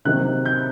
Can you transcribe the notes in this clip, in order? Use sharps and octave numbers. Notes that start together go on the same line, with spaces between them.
C3 D#3 F#3 A#3 D#4 F#6
G6